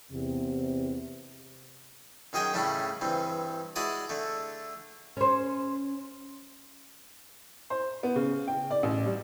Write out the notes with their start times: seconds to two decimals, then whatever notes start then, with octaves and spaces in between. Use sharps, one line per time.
0.12 E2 C3
2.33 F#2 D#3 G#4 D#5 G5 G#5
2.53 A2 C#3 G3 A3 D4 E4
3.01 G2 E3 C4
3.76 G#3 E4 F#4 D5 D#6
4.09 D3 A3
5.17 C#4 C5
7.70 C5
8.03 B3
8.16 C#3
8.48 G5
8.71 D5
8.83 A1
9.06 G3